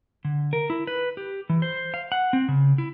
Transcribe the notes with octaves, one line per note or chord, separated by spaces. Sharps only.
D3
A#4
E4
B4
G4
E3
C5
F5
F#5
C4
C#3
E4